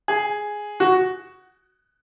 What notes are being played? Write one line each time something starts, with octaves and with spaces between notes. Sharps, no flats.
G#4
F#4